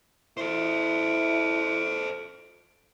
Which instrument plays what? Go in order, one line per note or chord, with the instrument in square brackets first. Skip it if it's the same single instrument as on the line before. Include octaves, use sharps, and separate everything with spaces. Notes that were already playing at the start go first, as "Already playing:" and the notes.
[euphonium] E4 [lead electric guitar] A4 C5